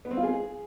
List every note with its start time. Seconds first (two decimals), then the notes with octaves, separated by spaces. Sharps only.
0.05 B3
0.11 C4
0.17 F4
0.23 G#4